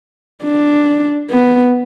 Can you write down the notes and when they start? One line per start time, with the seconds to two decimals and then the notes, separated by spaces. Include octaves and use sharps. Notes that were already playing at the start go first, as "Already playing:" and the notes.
0.44 D4
1.31 B3